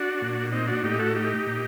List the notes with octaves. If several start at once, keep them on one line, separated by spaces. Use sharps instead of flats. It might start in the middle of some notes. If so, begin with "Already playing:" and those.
Already playing: D4 F#4
A#2
C4 D#4
D4 F#4
A2 D#4 G4
F#4 A4
D#4 G4
A#2